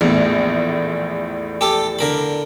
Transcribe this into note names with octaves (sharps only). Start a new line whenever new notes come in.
A#1 E2 A2
G4 A4
D3 A#4 B5